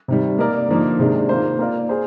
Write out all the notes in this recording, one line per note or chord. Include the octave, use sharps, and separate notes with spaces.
C3 D#3 G3
A#3 D#4 A#4 D5
D3 F3 A#3 D#4
C3 D#3 G#3 D4
D#3 A#3 F4 C5
A#3 F4 A#4 D5
G#4 C5